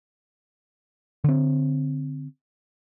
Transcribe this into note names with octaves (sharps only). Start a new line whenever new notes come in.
D3 C4